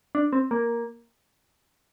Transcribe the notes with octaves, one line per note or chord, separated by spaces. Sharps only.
D4
C4
A#3